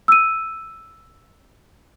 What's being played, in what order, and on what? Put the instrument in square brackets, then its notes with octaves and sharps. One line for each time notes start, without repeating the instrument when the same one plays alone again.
[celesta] E6 D#7